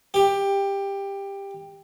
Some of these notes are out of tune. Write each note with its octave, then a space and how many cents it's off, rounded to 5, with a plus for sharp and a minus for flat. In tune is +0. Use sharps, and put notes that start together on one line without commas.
G4 +15